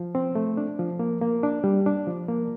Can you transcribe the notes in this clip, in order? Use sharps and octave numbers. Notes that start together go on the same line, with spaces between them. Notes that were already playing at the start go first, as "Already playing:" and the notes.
Already playing: F3
C4
A3
D4
F3
A#3
A#3
D4
G3
D4
F3
A#3